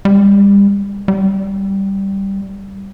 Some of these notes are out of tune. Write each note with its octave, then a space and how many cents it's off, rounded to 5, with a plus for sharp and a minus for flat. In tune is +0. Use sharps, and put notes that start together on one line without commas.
G3 +35
G3 -5